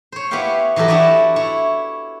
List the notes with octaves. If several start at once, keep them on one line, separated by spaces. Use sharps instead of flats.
C5 C#5
B3 E4 G4 C#5 F5 G5
E3 F#3 G4 A4 D#5
D4 E4 F#4 G4 C#5 D5
E4 C#5